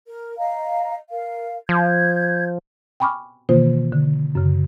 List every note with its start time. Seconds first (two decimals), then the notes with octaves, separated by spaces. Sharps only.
0.08 A#4
0.38 D#5 F5 A#5
1.10 A#4 F5
1.69 F3 G6 G#6
3.00 G5 G#5 B5 C#6 D6 F6
3.49 B2 D#3 E3 A#3 F4 C5
3.92 D3
4.35 F#2 C#3